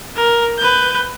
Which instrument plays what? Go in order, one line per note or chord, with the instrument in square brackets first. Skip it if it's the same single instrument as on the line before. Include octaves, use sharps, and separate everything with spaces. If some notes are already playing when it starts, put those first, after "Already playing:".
[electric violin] A#4
B4 G6